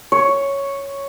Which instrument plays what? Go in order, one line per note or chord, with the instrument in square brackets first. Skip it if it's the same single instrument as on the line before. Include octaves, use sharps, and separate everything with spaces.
[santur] C#5